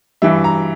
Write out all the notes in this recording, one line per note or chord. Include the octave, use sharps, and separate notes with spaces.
G2 E3 G3 E5
A#5